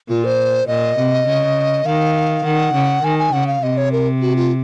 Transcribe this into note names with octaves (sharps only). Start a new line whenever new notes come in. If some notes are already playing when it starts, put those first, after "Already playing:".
A#2 F4
C5
A#2 D#5
C3
C#3
D#3 F5
D#3 F#5
C#3
D#3 G#5
G#5
C#3 F#5
F5
C3 D#5
C#5
A#4
F#4
F4